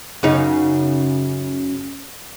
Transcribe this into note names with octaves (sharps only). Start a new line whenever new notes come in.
F#2 C#3 D#4